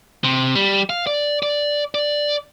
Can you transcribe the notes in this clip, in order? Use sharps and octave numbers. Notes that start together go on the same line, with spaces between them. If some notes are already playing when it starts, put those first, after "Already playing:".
C3
G3
F5
D5
D5
D5